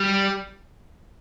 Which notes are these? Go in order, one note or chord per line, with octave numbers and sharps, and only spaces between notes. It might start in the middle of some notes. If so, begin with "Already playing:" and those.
Already playing: G3